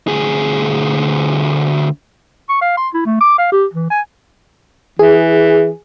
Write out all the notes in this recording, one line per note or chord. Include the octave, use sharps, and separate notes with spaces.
D2 G#4
C#6
F5
C6
E4
A3
D6
F5
G4
E3
G#5
E3 G#4